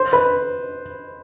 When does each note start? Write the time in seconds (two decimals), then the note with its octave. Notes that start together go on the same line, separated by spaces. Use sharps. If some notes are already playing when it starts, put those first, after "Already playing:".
Already playing: C5
0.13 B4